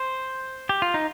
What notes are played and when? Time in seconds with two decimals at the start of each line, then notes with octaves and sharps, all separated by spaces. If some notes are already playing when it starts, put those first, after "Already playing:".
Already playing: C5
0.69 G4
0.82 F4
0.94 D#4